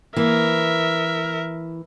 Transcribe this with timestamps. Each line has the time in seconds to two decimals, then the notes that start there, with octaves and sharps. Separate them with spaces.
0.16 E3 A#3 A#4 E5